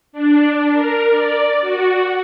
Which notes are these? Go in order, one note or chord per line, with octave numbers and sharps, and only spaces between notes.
D4
A#4
D5
F#4